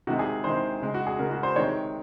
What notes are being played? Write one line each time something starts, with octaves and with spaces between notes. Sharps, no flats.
C3 D#3 G#3 F#4
G#4
C3 D#3 G#3 C5
C#3 G#3
F#4
G#4
C#3 G#3 A#4
F#4
C5
C3 D#3 G#3 C#5